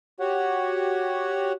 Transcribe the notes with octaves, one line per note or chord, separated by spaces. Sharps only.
F#4 G4 C#5 F#5